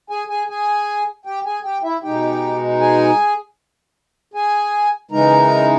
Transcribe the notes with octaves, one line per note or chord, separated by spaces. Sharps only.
G#4 G#5
G#4 G#5
G#4 G#5
G4 G5
G#4 G#5
G4 G5
E4 E5
B2 G#3 D#4 G4 G5
G#4 G#5
G#4 G#5
C#3 E3 G#3 D#4 A#4 A#5